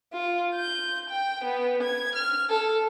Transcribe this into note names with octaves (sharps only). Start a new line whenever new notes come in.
F4
G6
G5
B3
G#6
F6
A4